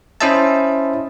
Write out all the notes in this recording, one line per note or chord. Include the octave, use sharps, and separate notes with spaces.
C#4 E4 C5 D#5 E5 A5